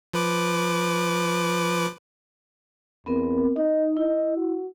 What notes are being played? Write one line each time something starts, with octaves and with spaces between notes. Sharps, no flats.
F3 B4 D6
E2 B3 C4 A#4
D#4 D#5
E4 D#5
F#4